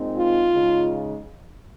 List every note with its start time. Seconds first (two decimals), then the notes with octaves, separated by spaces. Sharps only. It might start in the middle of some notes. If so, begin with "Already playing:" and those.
Already playing: A#2 G#3 C4 D#4
0.17 F4
0.51 C#3 G#3 D#4